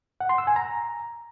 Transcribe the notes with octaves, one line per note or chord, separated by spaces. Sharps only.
F#5
C6
E6
G#5
A#5